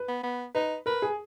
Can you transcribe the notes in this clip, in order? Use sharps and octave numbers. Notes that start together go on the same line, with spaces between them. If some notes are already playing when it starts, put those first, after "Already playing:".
Already playing: B4
B3
B3
D#4 B4
A#4 B4
G#4